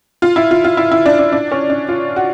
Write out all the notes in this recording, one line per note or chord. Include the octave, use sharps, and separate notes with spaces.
F4
E4
F4
F4
E4
E4
D4
D4
D4
C#4
D4
F4
F#4